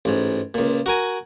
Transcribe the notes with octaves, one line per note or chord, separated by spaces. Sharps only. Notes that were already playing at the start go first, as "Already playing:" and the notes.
A1 G#2
C#2 A#2
F#4 A#4 G#5